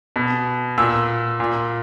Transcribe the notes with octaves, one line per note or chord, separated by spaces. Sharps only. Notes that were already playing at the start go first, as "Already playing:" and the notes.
B2
A#2 E6
A#2